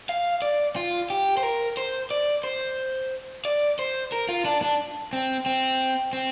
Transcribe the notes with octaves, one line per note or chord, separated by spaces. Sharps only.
F5
D5
F4
G4
C5
A#4
C5
D5
C5
D5
C5
A#4
F4
D4
D4
C4
C4
C4